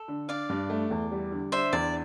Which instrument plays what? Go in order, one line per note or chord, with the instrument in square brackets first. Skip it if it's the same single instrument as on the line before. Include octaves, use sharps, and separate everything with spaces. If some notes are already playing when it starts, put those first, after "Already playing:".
Already playing: [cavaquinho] A4
[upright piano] D3
[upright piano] D4 [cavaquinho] D5 F5
[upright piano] G2
A3
E2
G3
D3
[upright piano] D4 [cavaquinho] C5 E5
[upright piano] E2 [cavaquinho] D5